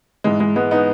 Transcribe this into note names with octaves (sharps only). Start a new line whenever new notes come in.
G#2 E3 G#3
G#3
G#3 B3
B3 D#4